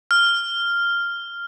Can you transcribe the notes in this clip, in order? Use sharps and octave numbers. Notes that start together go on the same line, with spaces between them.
F6